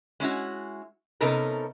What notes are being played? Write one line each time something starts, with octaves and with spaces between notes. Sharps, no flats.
G#3 C#4 E4 F#4
C3 B3 C#4 D#4 A4 A#4